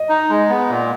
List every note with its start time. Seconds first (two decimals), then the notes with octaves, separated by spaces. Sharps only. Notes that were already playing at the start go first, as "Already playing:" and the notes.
Already playing: D#5
0.09 D#4
0.29 G#3
0.49 B3
0.70 A#2